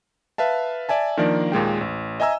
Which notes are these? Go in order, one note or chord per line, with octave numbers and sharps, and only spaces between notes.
B4 E5 F5 A5
D5 E5 G#5 A5
D#3 F3 A#3 D4 A#4 D5
D#2 A#2 G#3 G5
A1
D#5 E5 G#5 A#5 E6